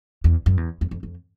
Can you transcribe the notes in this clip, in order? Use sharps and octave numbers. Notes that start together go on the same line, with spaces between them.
E2
F#2
E2
F2
F2
F2